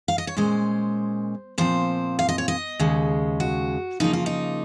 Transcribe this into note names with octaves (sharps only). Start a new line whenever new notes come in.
F5
D#5
C#5
A#2 G#3 C#4 C5
A#2 F3 C4 C5
F5
D#5
C#5
D#5
D#2 C#3 G#3
F#4
C#3 F3 A#3 D#4
F4
D#4